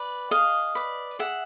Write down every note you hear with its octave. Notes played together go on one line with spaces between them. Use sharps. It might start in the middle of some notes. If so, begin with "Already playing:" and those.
Already playing: B4 D5
G#4 D#5 F5
B4 D5
G#4 E5 F#5